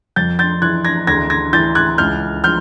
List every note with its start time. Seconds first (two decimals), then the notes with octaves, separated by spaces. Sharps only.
0.16 F2 G6 A6
0.39 G6 A6
0.62 E3 F#6 G#6
0.85 G#6 A#6
1.07 D2 G#6 A#6
1.30 G#6 A#6
1.53 E3 G6 A6
1.75 F#6 G#6
1.98 C#2 F6 G6
2.44 F3 F6 G6